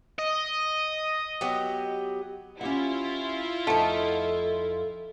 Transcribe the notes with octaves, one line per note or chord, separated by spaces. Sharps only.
D#5
F#3 B3 G4
C#4 E4 F4 G4 F#5
F2 A3 D#4 A4 F#5